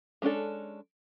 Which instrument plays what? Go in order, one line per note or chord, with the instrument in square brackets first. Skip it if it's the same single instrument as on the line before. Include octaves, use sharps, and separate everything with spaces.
[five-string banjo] G#3 C#4 D4 A4